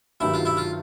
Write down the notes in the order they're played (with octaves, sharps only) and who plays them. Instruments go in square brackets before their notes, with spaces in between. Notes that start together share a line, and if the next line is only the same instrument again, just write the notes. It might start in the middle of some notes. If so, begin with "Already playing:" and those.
[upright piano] G2 D#3 F#3 A3 [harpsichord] E4
[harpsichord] F4
E4
F4